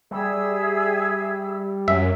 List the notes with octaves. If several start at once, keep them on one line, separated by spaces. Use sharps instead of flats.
G3 G#4 E5 E6
F#2 E5